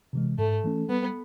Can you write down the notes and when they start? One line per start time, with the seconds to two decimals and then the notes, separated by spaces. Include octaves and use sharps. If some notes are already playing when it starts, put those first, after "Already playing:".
0.13 C3 E3 G#3
0.38 G#2 A3
0.64 E3 A3 C#4
0.89 G3 B3